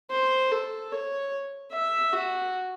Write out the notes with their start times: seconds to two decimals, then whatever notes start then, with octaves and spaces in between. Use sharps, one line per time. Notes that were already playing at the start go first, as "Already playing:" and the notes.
0.11 C5
0.51 A4
0.92 C#5
1.72 E5
2.13 F#4